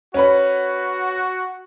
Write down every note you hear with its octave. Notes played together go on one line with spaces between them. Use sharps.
C#4 F#4 B4 B5